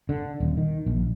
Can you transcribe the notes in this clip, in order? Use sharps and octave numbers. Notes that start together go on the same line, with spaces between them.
D3
D#1
D#3
A#1